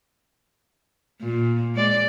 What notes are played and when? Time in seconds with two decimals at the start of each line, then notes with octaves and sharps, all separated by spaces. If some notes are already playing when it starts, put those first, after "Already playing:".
1.21 A#2
1.75 G#3 D5